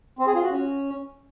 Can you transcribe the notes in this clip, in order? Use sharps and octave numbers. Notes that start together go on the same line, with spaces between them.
C4
G#4
F4
F#4
C#4